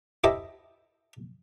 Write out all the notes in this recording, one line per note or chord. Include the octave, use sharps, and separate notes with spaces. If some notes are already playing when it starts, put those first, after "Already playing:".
E4 G4 A4 C5 D#5 E5